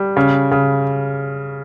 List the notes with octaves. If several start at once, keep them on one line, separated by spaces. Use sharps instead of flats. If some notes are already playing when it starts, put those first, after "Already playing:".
Already playing: G3
C#3
C#3